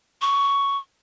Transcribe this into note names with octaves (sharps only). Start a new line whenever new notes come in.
C#6